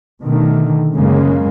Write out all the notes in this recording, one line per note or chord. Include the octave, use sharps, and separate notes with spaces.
B2 D3 D#3 A3
F#2 C#3 G#3 A#3 C#4